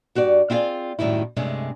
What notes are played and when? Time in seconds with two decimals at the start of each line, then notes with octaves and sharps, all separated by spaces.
0.15 G2 F#4 G4 D5
0.50 C4 E4 F4 G#4 D5 F5
0.99 F#2 A2 D#3 G3 E4
1.36 G2 C3 G#3 A3 C#4